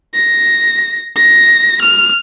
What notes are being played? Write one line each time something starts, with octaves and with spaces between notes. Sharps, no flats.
A#6
A#6
F6